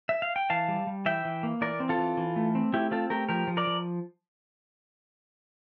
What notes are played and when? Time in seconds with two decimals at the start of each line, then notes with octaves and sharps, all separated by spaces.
0.09 E5
0.22 F5
0.36 G5
0.50 E3 F5 A5
0.68 G3
0.87 G3
1.06 E3 E5 G5
1.25 E3
1.43 A#3
1.61 E3 A#4 D5
1.80 C4
1.89 F4 A4
1.98 E3
2.17 E3
2.36 A3
2.55 C4
2.73 A3 E4 G4
2.91 C4 F4 A4
3.10 A3 G4 A#4
3.29 F3 G4 A#4
3.47 F3
3.57 A#4 D5
3.67 F3